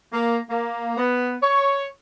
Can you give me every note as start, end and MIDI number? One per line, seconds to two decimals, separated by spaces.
0.12 0.37 58
0.49 0.95 58
0.97 1.35 59
1.41 1.84 73